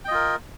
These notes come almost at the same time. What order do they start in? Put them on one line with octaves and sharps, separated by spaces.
G5 D#5 F4 A#4